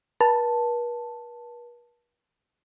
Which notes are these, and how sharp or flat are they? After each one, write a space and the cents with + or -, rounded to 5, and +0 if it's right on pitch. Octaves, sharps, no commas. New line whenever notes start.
B4 -45 A5 +0